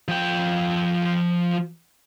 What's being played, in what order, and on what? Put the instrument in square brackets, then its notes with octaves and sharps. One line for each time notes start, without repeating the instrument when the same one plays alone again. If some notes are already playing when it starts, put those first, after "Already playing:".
[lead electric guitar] F3 G5